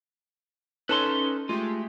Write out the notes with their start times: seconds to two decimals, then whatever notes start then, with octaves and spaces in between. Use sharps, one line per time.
0.89 C#4 D#4 A4 B4 A5 C6
1.49 G#3 A3 F4 G4